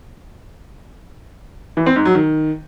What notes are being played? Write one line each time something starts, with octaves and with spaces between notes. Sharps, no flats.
E3
C4
G#2
F#3
D#3